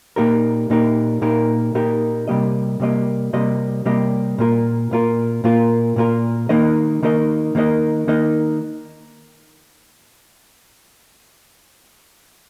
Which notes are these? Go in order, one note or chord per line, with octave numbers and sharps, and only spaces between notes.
A#2 A#3 D#4 G4 A#4
A#2 A#3 D#4 G4 A#4
A#2 A#3 D#4 G4 A#4
A#2 A#3 D#4 G4 A#4
C3 G3 A#3 G4 D#5
C3 G3 A#3 G4 D#5
C3 G3 A#3 G4 D#5
C3 G3 A#3 G4 D#5
A#2 A#3 F4 A#4
A#2 A#3 F4 A#4
A#2 A#3 F4 A#4
A#2 A#3 F4 A#4
D#3 A#3 D#4 A#4 D#5
D#3 A#3 D#4 A#4 D#5
D#3 A#3 D#4 A#4 D#5
D#3 A#3 D#4 A#4 D#5